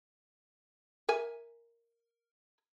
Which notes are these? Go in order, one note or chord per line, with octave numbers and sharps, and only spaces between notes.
A#4 E5 G#5